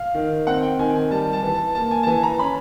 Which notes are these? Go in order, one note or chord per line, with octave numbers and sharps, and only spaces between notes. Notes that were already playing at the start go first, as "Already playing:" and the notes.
Already playing: F5
D#3
C4 F#5
G5
D#3 G#5
G#5
G3 A5
A5
E3
A5
A#3 A5
G#5
A5
E3 G#5
A#5
C#4 B5